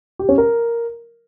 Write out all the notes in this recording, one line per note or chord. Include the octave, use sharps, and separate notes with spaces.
G4
C#4
A#4